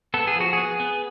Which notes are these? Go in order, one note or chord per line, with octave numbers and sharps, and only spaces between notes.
B3 A4
G#4
F3 F#4
B3 G#4
B3